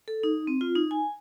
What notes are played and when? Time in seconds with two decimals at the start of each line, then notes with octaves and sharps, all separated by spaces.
0.08 A4
0.23 D#4
0.47 C4
0.61 F4
0.75 D#4
0.91 G#5